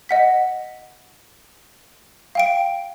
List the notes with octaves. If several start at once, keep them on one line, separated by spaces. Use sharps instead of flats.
D#5 F#5 B6
F5 G5 D7